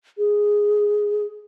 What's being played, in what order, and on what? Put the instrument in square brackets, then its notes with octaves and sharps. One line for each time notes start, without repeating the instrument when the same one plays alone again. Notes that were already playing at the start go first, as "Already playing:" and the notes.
[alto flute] G#4